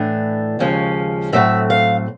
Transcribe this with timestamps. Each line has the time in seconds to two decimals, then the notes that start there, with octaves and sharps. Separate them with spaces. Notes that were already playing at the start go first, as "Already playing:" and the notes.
Already playing: A2 E3 A3 D4
0.59 D#2 C#3 F3 G#3 C#4
1.33 A2 F#3 A3 C4 E5
1.70 F5